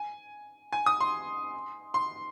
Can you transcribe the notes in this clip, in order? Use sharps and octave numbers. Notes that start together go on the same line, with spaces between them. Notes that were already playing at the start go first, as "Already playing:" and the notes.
Already playing: G#5
G#5
D#6
C6
C6